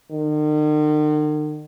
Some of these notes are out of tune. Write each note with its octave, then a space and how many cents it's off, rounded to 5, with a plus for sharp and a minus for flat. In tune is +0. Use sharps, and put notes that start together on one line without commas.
D#3 -45